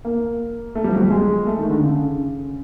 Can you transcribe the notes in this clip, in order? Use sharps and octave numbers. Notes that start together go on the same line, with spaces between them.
A#3
A3
G3
F3
F#3
G3
G#3
A3
D#3
D3
C#3